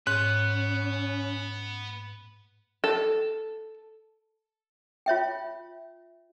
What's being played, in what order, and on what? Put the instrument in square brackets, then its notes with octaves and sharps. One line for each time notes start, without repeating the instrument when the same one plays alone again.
[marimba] G#2 [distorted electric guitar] B3 [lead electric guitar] C#4 [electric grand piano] F#6
[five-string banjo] A4
[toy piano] F4 C#5 E5 G5